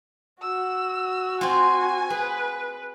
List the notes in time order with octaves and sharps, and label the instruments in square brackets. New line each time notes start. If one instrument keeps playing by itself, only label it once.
[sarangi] F#4 [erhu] E6
[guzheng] C4 F4 [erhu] G#5
[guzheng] G#4 [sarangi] B4